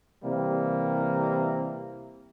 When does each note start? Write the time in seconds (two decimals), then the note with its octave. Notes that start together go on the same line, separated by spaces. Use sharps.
0.23 C3 E3 G3 A#3